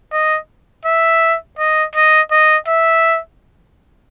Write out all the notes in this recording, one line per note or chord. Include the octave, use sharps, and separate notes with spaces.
D#5
E5
D#5
D#5
D#5
E5